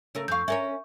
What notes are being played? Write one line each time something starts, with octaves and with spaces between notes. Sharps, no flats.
C#3 A3 A#4
F2 F5 C#6 G6
C#4 A#4 C#5 E5